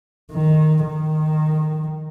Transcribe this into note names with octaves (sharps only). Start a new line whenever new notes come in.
D#3
D#3